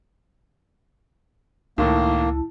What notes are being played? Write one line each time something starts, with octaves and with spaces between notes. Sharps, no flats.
C#2 A2 D#3 A#3 E4 A5